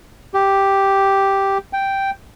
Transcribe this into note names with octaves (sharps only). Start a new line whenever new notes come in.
G4
G5